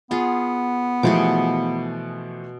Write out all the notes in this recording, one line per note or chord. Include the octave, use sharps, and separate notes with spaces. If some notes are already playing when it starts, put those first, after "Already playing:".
B3 F4 G#4 F#5
B2 E3 F3 A3 G#4 D6